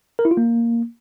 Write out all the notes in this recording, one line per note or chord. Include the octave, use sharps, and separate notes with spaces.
A#4
E4
F4
A#3